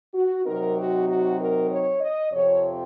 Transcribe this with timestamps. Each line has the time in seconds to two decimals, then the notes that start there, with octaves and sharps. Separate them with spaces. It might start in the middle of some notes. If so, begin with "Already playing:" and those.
0.14 F#4
0.45 C3 F#3 C4 D#4 A#4
0.76 F#4
1.07 F#4
1.39 A#4
1.70 C#5
2.01 D#5
2.31 F2 C3 F3 C4 C#5